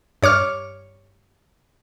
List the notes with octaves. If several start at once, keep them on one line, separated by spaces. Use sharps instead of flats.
G2 C#5 D6 F6